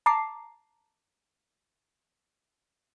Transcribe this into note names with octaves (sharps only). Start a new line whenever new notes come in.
A5 A#5 D6 C7